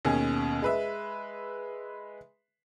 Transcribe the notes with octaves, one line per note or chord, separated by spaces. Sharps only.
D#2 B2 C#4 G#4
G#3 B4 E5